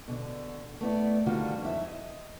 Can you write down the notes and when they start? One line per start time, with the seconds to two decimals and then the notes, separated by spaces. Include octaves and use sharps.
0.08 B2 D3
0.81 A3 B3 E4 D5
1.26 D2 D3 D#3 G3 F4 F#4
1.62 F2 G#2 E4 E5
1.87 D#5